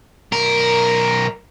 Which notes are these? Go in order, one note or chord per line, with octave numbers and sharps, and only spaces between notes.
B1 A#4